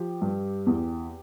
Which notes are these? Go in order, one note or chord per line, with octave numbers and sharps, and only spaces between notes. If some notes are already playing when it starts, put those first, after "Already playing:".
Already playing: F3 G4
G2
E2